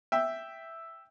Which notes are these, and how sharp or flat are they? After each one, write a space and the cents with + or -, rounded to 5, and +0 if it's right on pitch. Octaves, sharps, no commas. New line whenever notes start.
E5 +0 G5 +0